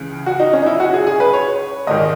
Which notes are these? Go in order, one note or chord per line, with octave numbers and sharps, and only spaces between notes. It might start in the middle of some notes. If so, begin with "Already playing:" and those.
Already playing: C#2 C#3 E3
F#4
D#4
C#4
D#4
E4
F#4
G#4
G#4
B4
C#5
A#1 G#2 D#3 D#5